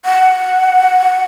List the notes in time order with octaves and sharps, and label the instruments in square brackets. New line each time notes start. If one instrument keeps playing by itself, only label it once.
[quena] F#5